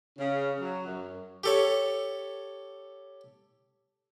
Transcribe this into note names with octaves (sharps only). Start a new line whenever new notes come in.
C#3
F#3
F#2
G4 A4 C#5